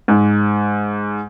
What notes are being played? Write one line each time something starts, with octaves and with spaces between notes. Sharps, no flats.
G#2